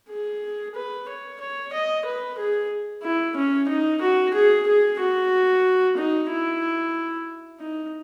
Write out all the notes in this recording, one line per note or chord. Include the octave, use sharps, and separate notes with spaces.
G#4
B4
C#5
C#5
D#5
B4
G#4
E4
C#4
D#4
F#4
G#4
G#4
F#4
D#4
E4
D#4